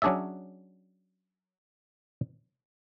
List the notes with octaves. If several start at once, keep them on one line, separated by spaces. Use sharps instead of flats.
F#3 C#4 D4 G#4 D5 E5